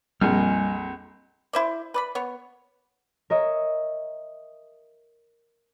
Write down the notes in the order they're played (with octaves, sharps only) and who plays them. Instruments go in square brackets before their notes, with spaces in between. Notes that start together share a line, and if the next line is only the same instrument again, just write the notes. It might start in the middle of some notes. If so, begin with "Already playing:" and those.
[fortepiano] A#1 F2 [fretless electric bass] G3 [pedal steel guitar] D#5 G#5 F6
[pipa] E4 C5 D5
B4 D5 B5
B3 C#5
[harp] A#4 C#5 D#5 E5